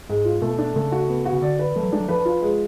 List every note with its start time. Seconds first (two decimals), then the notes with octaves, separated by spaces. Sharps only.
0.09 G#2 G#3
0.25 F4
0.42 B2 A3
0.58 D4
0.76 C#3 A3
0.92 F#4
1.09 B3
1.25 F#4
1.33 C#3
1.42 D3 D5
1.59 B4
1.76 F3 A3
1.83 F#3
1.92 G#3 D4
2.00 F#3
2.08 F3 B4
2.25 F4
2.42 G#3